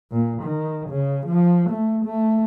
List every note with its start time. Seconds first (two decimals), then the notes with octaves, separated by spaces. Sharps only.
0.12 A#2
0.43 D#3
0.90 C#3
1.27 F3
1.70 A3
2.05 A3